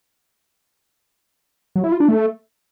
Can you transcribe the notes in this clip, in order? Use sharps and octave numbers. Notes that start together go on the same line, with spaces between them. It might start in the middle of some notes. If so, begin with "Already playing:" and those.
F#3
E4
F4
D4
A3